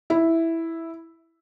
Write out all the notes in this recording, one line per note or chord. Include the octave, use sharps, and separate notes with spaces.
E4